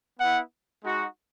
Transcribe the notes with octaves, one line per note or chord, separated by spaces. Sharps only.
B3 E4 F#5
G#3 D#4 F#4